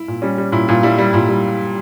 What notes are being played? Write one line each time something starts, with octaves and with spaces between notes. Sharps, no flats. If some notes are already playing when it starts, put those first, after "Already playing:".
Already playing: E4
A#2
G3 C#4
G3
A#2 E4
A#2 F4
G3 E4
G3
A#2 E4
G3